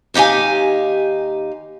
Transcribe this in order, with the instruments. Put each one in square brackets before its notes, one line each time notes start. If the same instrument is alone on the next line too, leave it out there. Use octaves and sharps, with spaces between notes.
[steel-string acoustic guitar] D#2 D#4 G4 F5 G#5